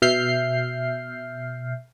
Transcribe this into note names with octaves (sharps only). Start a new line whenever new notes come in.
B2 E5 F6 G6 C7